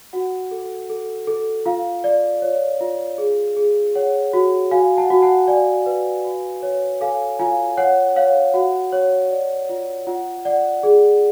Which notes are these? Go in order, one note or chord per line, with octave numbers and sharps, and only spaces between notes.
F#4 F#5
A4
A4
A4
F4 F5
D5
C#5
F4
G#4
G#4
C#5 F#5
F#4
F#4 F5 G#5
F#5 A5
F#4
F#5 A5
D5 F5 G#5
B4
F#4
C#5
A4 F5 G#5
F4 F5 G#5
C#5 F#5
C#5 F5
F#4 F#5
C#5
D5
F4
F4 F#5
D5 F#5
G#4